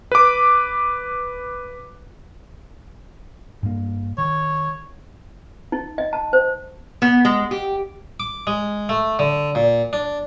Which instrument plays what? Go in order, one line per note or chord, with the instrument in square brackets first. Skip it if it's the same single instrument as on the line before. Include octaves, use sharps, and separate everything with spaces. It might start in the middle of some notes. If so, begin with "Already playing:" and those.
[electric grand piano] B4 D6
[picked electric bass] G2 A#3
[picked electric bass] D#3 [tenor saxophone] C#5
[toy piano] D#4
D#5
A5
C5
[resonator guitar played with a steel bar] B3
G#3
G4
[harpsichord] D6
G#3
A3
D3
A#2
D4